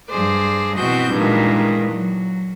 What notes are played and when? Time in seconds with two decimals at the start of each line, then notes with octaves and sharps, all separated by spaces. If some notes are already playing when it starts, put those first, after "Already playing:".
0.10 G2 G#4 C5 D5
0.76 B2 E3 C4 F#4 D#5 G6
1.13 G2 A#2 D#3 E3 G#3
1.92 F#3